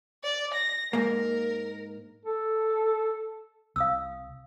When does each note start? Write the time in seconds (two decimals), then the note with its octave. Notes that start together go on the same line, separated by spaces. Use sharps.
0.23 D5
0.54 A#6
0.93 G#2 A#3 A#4
2.26 A4
3.76 C2 F5 D#6 E6